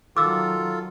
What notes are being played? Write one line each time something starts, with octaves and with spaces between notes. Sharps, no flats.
D#3 F#3 F4 A4 D6 E6